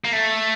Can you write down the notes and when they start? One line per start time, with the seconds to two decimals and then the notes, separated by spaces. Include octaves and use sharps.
0.04 A#3
0.13 A3